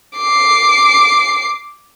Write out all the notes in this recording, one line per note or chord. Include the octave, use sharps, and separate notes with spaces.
D6 C7